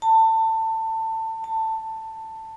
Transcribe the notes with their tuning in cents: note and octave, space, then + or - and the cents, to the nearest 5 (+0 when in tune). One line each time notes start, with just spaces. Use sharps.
A5 +25
A5 +15